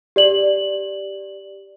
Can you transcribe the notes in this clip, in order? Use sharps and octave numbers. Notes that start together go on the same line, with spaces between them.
G4 D5 F#7